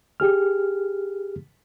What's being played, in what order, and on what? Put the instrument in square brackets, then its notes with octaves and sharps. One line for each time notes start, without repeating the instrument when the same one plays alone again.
[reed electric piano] G4 G#4 F6